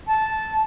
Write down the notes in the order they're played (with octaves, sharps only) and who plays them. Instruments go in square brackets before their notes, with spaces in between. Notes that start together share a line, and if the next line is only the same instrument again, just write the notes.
[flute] A5